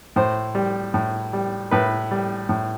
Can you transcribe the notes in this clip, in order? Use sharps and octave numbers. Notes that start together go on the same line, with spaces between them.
A2 C5
G3
A2
G3
A2 B4
G3
A2